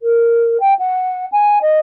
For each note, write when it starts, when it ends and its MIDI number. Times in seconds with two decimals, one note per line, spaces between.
0.01 0.57 70
0.60 0.74 79
0.79 1.26 78
1.32 1.59 80
1.62 1.79 75